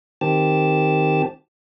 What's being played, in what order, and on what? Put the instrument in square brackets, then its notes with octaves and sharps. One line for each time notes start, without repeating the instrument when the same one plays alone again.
[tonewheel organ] D#3 C4 G4 A5